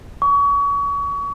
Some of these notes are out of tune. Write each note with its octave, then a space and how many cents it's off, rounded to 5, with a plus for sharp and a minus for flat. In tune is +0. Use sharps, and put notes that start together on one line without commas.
C#6 +35